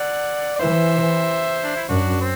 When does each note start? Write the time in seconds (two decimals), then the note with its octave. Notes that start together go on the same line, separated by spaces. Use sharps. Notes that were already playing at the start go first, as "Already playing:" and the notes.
Already playing: D5 F#5
0.56 D5
0.59 E3 C5 E5
1.64 D4
1.76 E4
1.89 F#2 D4 F#4
2.20 C4